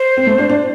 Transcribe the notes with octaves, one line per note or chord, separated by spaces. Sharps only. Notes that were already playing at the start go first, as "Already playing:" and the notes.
Already playing: C5
C4
A3
D4
D4